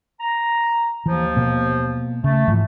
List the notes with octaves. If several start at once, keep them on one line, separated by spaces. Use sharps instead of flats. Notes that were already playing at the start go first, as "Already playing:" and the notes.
A#5
D#2 E3 F3
B2 A#3
C#3 A3
G#2 E3 F3